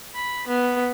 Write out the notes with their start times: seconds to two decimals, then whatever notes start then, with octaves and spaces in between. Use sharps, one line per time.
0.15 B5
0.47 B3